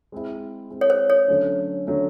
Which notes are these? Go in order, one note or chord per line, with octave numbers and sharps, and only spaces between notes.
G#3 C4 E4
G#3 C4 E4
C#5
C5
C#5
D3 F#3 A3 C#4
D3 F#3 A3 C#4